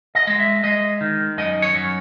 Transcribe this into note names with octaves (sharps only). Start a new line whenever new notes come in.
D#5
G#3
E5
G#3 D#5
D#3
F#2 D#5
C#5
F#2